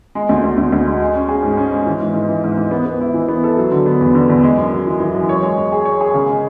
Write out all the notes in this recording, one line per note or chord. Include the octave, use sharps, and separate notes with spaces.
G#3
D2
D2
D2
D2
G#3
G#3
C#4
G#4
G#2
C#4
G#3
E3
G#2
G#2
E3
G#2
G#2
B3
B3
E4
E3
B3
A4
F#3
D3
B3
E2
D3
E2
G#3
F#2
F#2
E3
E3
F#2
C#5
G#3
G#3
G#4
C#5
G#4
C#3
G#3